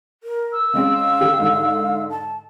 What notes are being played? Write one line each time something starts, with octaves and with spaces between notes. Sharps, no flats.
A#4
E6
C#3 G#3 C4 F5
D3 G4
G#2 D3
A5